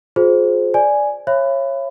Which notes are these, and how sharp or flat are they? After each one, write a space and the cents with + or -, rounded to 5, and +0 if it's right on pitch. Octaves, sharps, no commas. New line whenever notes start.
F4 +40 G#4 +25 C5 +0
D5 +0 G#5 +0
C#5 -25 E5 +45 B5 +25